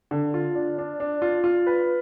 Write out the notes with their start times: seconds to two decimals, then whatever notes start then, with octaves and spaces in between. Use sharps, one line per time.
0.11 D3
0.34 F4
0.55 D4
0.78 D4
1.00 D4
1.22 F4
1.44 F4
1.67 B4